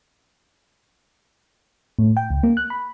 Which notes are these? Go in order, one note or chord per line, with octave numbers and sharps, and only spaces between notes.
A2
G5
C#2
A#3
F#6
B5